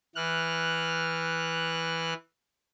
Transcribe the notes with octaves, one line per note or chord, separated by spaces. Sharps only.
E3 F6 F#6